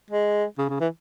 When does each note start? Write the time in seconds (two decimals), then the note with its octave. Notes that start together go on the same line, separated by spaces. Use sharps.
0.11 G#3
0.58 C#3
0.69 C#3
0.80 E3